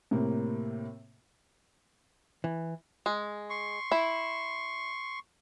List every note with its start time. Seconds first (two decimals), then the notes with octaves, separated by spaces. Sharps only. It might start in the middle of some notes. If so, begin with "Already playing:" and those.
0.11 A2 C3 A#3 C4
2.44 E3
3.06 G#3
3.50 C6 C#6
3.92 E4